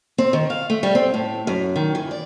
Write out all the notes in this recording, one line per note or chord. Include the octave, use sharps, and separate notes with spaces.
C4
D#3
F5
A3
G3
C4
A2
F#2
D#3
E3
D5